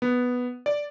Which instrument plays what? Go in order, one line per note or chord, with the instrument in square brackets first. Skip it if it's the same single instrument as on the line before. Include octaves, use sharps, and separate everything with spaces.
[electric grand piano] B3
D5